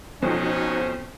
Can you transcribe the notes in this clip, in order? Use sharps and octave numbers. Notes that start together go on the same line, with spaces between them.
F2 B2 F3 C#4 D#4 F#4 C5